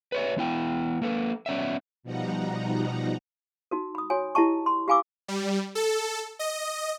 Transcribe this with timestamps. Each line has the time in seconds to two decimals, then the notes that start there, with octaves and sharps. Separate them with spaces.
0.12 B4 C#5 E5
0.36 E3 B3 E4 G5
1.02 A#3 A4 B4
1.46 B3 C#4 D5 E5
2.03 B2 F3 G3 D#4 F#5 A#5
3.71 D#4 F#4 A#4
3.95 B5 D#6
4.10 F#4 C#5 G#5
4.35 E4 G4 D#5 A5 C#6
4.66 C6
4.88 G4 F5 G#5 B5 D6 E6
5.28 G3
5.75 A4
6.39 D#5